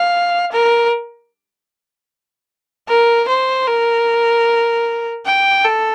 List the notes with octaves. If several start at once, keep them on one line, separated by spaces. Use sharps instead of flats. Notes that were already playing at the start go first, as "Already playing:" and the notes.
Already playing: F5
A#4
A#4
C5
A#4
G5
A4